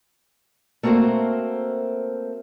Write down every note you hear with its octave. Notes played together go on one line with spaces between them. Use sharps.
A3 A#3 C4 F#4 A#4 C5